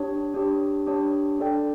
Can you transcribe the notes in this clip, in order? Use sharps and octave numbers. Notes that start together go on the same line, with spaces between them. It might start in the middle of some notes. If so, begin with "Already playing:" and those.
Already playing: D4 G4 C#5
D4 G4 C#5
D4 G4 C#5
D4 A4 D5 G5